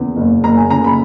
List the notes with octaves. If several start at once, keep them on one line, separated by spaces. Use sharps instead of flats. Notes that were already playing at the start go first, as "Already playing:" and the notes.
Already playing: E2 C#3
F#1
F#1 A#5
G#5
C#3 A#5
B5